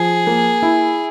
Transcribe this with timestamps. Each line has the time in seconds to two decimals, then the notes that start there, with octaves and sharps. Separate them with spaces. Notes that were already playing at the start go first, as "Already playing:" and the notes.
Already playing: F3 G#4
0.27 A#3
0.62 E4